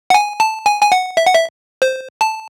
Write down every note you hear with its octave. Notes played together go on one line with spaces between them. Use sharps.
F#5
G#5
A5
G#5
G#5
F#5
E5
F#5
E5
C5
A5